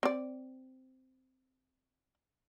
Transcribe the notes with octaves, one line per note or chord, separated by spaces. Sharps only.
C4 D5